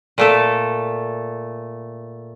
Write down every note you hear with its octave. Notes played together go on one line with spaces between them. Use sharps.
A#2 A3 A4